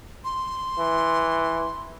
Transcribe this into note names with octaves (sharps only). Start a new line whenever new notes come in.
C6
E3